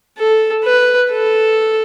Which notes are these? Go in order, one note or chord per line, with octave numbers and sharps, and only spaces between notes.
A4
B4
A4